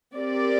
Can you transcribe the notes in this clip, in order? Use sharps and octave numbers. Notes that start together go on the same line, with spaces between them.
C4 G4 A#4 D5